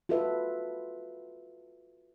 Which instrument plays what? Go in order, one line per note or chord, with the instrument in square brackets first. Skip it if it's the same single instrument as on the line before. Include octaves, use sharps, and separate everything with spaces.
[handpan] F4 F#4 A4 B4 E5